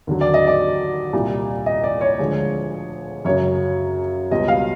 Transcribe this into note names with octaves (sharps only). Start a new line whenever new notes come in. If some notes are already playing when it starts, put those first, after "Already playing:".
D#2 D3 F#3
D5
D#5
D5
C2 A#2 G3
D#5
D5
C#5
D2 D3 F3 G#3
F#2 C#3 F#3 C#5
C#2 B2 G3 D#5
F5